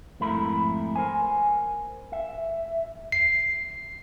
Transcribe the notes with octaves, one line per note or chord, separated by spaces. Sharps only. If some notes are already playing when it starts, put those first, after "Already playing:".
F2 G#2 A3 E4 A#4 B5
A#4 C5 G#5
E5
C7